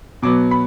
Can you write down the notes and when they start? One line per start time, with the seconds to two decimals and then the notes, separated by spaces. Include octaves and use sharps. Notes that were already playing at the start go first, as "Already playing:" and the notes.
0.22 B2 F#3 B3 D6
0.51 B5